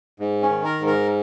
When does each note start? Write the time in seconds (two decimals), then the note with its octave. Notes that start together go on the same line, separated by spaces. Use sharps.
0.20 G#2
0.42 C#4
0.50 D#3
0.64 A#4
0.80 G#2
0.87 A#4